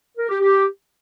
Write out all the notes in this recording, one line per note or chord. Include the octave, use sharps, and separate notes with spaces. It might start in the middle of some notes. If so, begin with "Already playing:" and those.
A#4
G4
G4